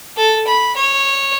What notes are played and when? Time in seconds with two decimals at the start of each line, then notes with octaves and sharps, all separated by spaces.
0.17 A4
0.47 B5
0.76 C#5